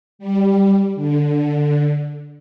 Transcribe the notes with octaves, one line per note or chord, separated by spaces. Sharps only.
G3
D3